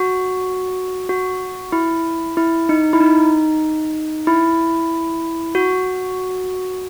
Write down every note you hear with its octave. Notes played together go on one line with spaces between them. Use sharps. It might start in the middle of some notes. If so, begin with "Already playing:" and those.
Already playing: F#4
F#4
E4
E4
D#4
E4
D#4
E4
F#4